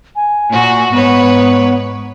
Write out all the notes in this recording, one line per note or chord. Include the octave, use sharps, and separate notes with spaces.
G#5
A#2 F#4
G#2 B3 B4 C#5